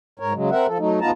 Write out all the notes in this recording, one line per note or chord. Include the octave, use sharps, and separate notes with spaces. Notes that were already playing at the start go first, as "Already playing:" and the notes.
G#2 A#4 C#5
C#3 F#3 G#3
C4 A#4 E5 F#5
F3 A4
F#3 A3 D#4
D2 B3 D#4 F4 A5 A#5